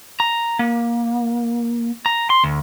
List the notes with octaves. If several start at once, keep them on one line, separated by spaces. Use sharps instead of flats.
A#5
A#3
A#5
C6
D2